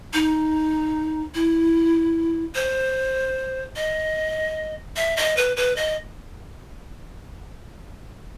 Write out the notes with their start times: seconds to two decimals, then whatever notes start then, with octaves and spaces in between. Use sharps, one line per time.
0.13 D#4
1.35 E4
2.55 C5
3.76 D#5
4.96 E5
5.17 D#5
5.37 B4
5.57 B4
5.76 D#5